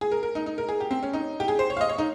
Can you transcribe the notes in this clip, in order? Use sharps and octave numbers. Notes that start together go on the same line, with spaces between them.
G#4
A#4
A#4
D#4
D#4
A#4
G#4
G4
C4
C#4
D#4
G4
G#4
C5
C#5
F5
D#5
C#5
D#4